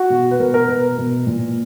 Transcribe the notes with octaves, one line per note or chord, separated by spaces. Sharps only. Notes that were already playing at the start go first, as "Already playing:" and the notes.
Already playing: F#4
B2
B4
B2 A#4
A#4
B2 B4
B2
A#2